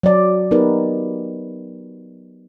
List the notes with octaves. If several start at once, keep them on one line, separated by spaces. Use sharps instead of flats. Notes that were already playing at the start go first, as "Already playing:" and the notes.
F#3 D5
B3 D#4 G4 A#4 B4 D5